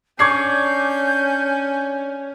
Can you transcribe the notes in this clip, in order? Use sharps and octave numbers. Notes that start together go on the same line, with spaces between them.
C#4 D4 D5 C#6 G6 G#6 C7